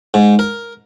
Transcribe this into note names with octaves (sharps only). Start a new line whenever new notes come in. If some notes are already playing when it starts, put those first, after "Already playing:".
G#2
A#4